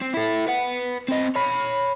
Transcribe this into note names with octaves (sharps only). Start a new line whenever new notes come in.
C4
E4 A4
B4 F#5
C4 D#5
C#5 B5